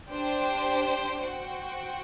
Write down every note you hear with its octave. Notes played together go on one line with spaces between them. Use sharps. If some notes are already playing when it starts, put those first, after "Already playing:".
D4 G4 C5 G5
F#4 C5 G5